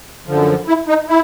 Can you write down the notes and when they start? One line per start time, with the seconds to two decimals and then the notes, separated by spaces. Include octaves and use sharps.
0.26 F#2 D3 F3
0.67 E4
0.88 D#4
1.08 E4